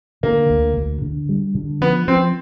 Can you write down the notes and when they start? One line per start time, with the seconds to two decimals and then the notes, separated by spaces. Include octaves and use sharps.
0.23 D3 A#3
0.50 D2
0.77 D2
1.02 D3
1.29 G3
1.55 D3
1.81 F3 B3
2.08 F3 C4